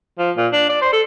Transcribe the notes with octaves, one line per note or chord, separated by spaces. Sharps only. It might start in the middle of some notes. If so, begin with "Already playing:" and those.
F3
A#2
D4
D5
C5
A4